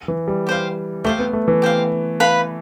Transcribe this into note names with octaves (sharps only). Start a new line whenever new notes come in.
E3
G3
G4 C5 F5
A3 G4 C5 F5
B3
A3
E3
G4 C5 F5
B4 F5 B5